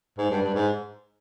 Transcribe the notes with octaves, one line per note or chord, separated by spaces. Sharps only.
G#2
G2
G2
G#2